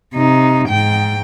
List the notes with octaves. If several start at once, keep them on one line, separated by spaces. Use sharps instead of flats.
C3 D#4
G#2 G5